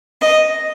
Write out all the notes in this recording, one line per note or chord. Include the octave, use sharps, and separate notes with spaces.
D#5